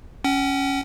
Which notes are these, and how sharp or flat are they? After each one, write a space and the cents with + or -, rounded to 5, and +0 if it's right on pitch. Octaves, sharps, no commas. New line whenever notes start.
C#4 -5 F#5 +45